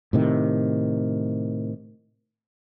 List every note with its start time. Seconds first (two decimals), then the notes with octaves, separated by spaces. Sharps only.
0.13 A2 C3 D#3